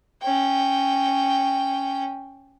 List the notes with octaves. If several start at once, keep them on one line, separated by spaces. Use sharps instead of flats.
C#4 G5